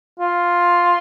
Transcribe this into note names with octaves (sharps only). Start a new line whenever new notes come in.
F4